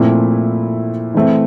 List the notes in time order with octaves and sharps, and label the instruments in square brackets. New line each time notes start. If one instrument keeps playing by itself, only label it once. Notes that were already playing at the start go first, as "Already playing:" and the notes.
Already playing: [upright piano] A#2 F3 A3 C4 E4
E3 A3 C4